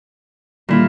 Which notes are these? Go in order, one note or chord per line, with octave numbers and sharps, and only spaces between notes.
A#2 D3 D#3 G3 E4 F4